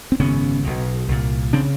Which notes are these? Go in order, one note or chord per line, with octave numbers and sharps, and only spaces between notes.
C4
G#1 F#2 C#3 B3 C#4
B1 B2
C2 A#2
C#3 C4 D4